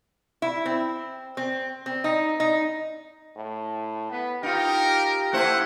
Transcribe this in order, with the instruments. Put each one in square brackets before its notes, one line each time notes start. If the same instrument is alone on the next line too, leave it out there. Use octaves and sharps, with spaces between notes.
[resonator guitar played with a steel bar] E4
C4
C4
C4
D#4
D#4
[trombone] A2
[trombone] B3 [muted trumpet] B4
[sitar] D#4 F4 [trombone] G4 [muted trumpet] A#4
[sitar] A3 E4 C5 [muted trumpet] F#5